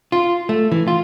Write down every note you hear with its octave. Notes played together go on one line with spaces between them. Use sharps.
F4
A3
E3
F4